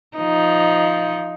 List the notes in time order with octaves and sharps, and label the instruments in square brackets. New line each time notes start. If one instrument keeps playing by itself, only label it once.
[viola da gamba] F3 D#4